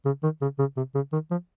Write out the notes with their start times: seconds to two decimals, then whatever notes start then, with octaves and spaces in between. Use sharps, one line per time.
0.05 C#3
0.23 D#3
0.41 C#3
0.59 C#3
0.77 C3
0.95 C#3
1.13 D#3
1.31 F3